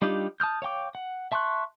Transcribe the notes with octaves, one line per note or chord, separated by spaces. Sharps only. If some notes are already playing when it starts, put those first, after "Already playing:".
G3 D4 D#4 F4 G4
A5 D#6 F6 G6
C#5 F5 G5 D6
F#5
E5 A5 C6 C#6 F#6